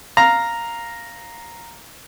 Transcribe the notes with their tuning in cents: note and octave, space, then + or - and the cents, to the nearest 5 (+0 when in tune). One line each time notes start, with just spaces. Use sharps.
F5 +0 A#5 +0